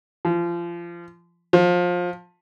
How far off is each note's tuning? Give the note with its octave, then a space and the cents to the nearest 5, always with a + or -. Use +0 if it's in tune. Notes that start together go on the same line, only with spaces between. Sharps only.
F3 -25
F3 +25